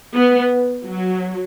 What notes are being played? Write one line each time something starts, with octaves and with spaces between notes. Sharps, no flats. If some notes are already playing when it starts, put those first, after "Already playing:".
B3
F#3